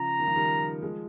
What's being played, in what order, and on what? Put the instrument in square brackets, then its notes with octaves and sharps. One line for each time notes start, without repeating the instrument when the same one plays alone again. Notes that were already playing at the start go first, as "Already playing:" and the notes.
Already playing: [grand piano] C#3 F3 [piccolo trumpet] A#5
[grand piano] D#3
F3
D#3 G3
F3 G#3